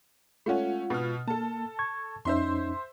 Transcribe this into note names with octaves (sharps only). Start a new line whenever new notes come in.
G#3 A3 C#4 F4 F#5
B2 B3 F6
A#3 A4 A5
C#6 G#6
F2 C#4 D#4 C5 E5 C6